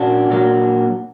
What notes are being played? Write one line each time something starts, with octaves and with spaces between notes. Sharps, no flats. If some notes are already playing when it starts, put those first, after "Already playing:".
Already playing: A#2 A#3 C#4 D4 F#4
A#2 F#3 A#3